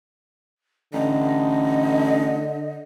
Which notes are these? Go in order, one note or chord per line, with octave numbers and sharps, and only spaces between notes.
A1 D3 D#5